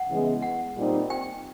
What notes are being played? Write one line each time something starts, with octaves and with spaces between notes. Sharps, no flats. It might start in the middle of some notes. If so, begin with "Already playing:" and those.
Already playing: F#5
C#3 E3 G#3 B3
F#5
A#2 G3 C4 D#4
G5